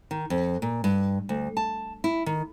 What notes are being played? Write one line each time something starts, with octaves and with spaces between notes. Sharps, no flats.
D#3
F2
A#2
G2
D2
A5
E4
D#3